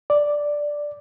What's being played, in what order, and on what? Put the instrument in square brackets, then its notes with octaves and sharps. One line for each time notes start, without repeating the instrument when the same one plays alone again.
[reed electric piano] D5